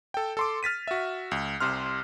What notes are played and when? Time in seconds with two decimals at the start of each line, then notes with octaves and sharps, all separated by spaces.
0.14 A4 G5
0.37 A4 C6 D6
0.63 F6 A6 B6 D#7
0.88 F#4 E5
1.31 C#2
1.60 C2 C3 C6 F6